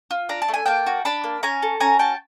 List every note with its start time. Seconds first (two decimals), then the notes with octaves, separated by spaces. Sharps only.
0.11 F4
0.29 D4 A#5
0.42 A5
0.48 A3
0.54 G#5
0.66 A#3 G5 A5
0.86 F#4
1.05 D4 A5 B5
1.24 A#3
1.43 C#4 G#5 A#5
1.62 A4
1.80 C#4 G#5 A#5
1.99 F#4 G5 A5